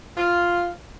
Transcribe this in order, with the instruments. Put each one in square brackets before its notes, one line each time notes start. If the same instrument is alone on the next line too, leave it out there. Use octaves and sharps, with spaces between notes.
[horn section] F4